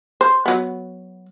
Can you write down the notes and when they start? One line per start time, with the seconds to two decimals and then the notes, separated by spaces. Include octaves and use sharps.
0.21 C5
0.46 F#3 B3